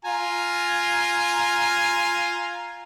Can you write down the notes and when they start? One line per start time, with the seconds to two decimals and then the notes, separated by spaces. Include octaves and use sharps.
0.05 F4 G#5 A#5